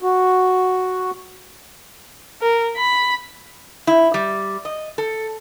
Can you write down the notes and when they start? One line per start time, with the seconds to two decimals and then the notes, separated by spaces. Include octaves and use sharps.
0.02 F#4
2.42 A#4
2.76 B5
3.87 E4
4.14 G3
4.65 D#5
4.98 A4